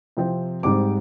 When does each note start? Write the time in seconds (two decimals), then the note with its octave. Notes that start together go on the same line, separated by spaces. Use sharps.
0.17 C3 F3 C4
0.63 G#2 G3 C4 D6